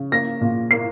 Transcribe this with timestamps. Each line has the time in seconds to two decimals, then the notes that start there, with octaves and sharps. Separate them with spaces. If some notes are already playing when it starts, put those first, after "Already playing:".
Already playing: C#3
0.12 A#3 A#6
0.41 A#2
0.71 A#3 C7